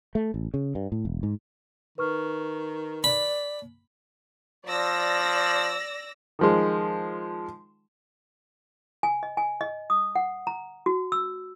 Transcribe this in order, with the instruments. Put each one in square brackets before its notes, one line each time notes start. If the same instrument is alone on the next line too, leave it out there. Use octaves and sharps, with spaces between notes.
[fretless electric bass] A3
A1
C#3
G2
A2
E1
G#2
[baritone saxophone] D#3 [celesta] B4 C#6 F6
[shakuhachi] D5 [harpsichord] B5
[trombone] F3 [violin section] D5 E6 A#6
[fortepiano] D#3 F3 G#3
[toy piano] G#5
D#5
G#5
D#5
D#6
F#5
A#5
F#4
E6